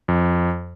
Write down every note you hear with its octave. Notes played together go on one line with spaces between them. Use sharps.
F2